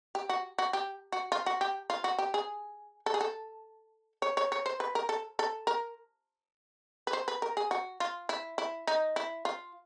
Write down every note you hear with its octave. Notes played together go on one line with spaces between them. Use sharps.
G4
F#4
F#4
G4
F#4
F4
F#4
G4
F4
F#4
G4
G#4
A4
G#4
A4
C#5
C#5
C#5
C5
B4
A#4
A4
A4
A#4
B4
C5
B4
A#4
G#4
F#4
F4
E4
E4
D#4
E4
F4